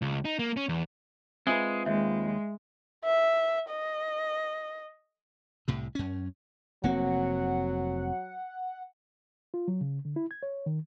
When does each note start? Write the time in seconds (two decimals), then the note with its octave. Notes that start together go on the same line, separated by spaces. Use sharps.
0.02 C#2
0.25 D#4
0.39 A#3
0.57 C#4
0.69 E2
1.47 G#3 C4 F4 B4 E5 G#5 D#6
1.86 D#2 G#3 E5
3.04 E5
3.70 D#5
5.68 C2 A2 C3
5.95 F#2 C#4
6.84 F1 F#3 A#3 C4 F#5
9.54 F4
9.68 F#3
9.81 C#3
10.05 D3
10.16 E4
10.31 G#6
10.43 C#5
10.66 D#3